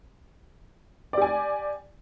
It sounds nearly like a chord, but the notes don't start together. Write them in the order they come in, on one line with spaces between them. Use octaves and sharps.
D5 G4 G#5